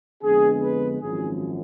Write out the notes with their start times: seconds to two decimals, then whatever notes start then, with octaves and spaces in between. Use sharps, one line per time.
0.23 F2 D3 G#3 B3 D4 G#4
0.62 B4
1.01 G#1 F#2 F3 G#4